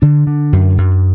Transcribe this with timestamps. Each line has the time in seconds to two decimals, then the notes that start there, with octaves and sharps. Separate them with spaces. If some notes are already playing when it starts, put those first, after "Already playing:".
0.02 D3 D4
0.27 D3
0.53 F#2
0.78 F#2